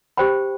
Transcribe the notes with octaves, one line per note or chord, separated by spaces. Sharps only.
G4 C5 G5 B5